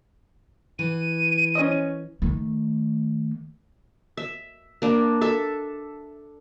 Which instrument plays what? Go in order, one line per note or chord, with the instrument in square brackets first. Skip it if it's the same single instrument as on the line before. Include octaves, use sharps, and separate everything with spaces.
[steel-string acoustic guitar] E3 [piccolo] D#7
[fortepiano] C#4 C5 D#5
[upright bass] D#3 A3
[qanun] E5
A#3 D4
A4 E5